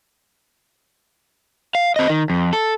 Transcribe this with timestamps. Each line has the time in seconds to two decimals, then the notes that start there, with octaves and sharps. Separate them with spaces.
1.75 F5
1.96 C4 D#5
2.09 D#3
2.30 F2
2.53 A4